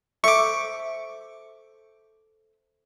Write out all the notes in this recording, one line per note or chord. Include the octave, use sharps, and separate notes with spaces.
A4 C5 E5 C#6 D6